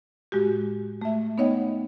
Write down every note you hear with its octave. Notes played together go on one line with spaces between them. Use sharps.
A2 G#3 F#4 G4
A3 E5
B3 D#4 C#5 D#5 F#5 G5